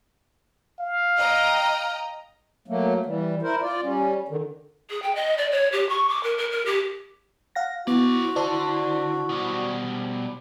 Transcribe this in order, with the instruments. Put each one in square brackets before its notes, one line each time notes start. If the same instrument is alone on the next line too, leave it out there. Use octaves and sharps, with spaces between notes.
[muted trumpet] F5
[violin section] D#5 G5 A#5
[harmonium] F#3 A3 A#3
E3 G3
E4 A#4 C5
F4 D5
G3 C#4
D3 D#3
[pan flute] G#4
G5
D#5
D5
C#5
G4
C#6
D6
A#4
A#4
A#4
G4
[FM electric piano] F5 F#5 A#6
[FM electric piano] B3 [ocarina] E4 [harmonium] F#4 [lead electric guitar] C5 D5
[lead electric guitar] D3 [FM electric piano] C5 D5 A5
[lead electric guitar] B2 G3